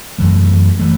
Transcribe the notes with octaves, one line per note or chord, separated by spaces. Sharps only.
F#2 E3 A3
E3 A3